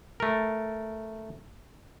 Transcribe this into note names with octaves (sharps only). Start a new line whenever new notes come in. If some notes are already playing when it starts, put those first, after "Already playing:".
A3 A#4